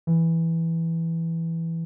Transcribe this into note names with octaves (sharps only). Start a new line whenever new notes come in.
E3